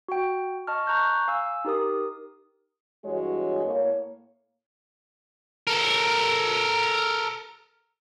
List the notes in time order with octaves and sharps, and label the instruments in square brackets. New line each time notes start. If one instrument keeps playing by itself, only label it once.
[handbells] F#4 G5
D#5 A5 C#6 F6
A#5 C#6 F#6 G6
F5 G#5 E6
D#4 G4 A#4 D#6
[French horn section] G2 E3 G#3 F#4 C#5
A2 A#3 C#5
[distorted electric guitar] A4 A#4